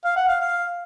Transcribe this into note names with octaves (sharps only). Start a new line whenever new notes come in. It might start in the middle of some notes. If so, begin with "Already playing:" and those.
F5
F#5
F5
F5